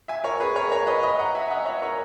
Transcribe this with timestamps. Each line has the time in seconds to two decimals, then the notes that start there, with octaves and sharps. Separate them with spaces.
0.08 E5 G#5
0.24 A#4 C#5
0.40 G#4 B4
0.55 A#4 C#5
0.72 A#4 C#5
0.87 B4 D#5
1.03 B4 D#5
1.19 F#5 A#5
1.35 E5 G#5
1.50 D#5 F#5
1.65 C#5 E5
1.82 A#4 C#5